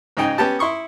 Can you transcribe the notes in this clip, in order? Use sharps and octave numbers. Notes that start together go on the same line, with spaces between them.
G#2 C#3 D#4 D#5 G5 G#5
B3 C#4 G4 A5
E4 C6 C#6 D#6